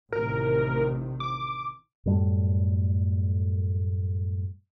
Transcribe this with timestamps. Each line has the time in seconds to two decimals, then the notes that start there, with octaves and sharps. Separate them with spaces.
0.13 A1 C3 D#3 A#4
1.20 D6
2.06 F#2 A2 G3 A3